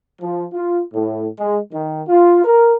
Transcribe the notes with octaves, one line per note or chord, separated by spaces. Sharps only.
F3
F4
A2
G#3
D#3
F4
A#4